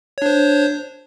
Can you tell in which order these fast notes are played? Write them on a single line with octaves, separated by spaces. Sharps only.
C#5 D4 C5